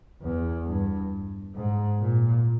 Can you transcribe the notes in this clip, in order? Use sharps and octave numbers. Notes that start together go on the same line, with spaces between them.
E2
G2
G#2
A#2